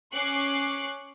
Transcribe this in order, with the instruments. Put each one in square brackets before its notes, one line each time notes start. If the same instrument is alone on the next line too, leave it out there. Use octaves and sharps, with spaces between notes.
[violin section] C#4 C#6 D6 F#6 C7